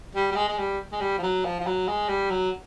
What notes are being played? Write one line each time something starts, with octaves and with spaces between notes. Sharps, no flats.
G3
G3
G#3
G#3
G3
G#3
G3
F3
F#3
F3
F3
F#3
G#3
G3
F#3